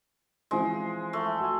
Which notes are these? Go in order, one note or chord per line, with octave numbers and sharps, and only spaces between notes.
E3 F3 G#3 C4
A3
F#4 G#5